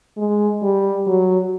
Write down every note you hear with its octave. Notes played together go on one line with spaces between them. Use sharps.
G#3
G3
F#3